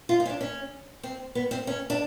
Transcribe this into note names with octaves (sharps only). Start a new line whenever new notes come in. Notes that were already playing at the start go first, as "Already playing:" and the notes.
F4
D#4
C#4
D4
C#4
C4
B3
C4
C#4
D4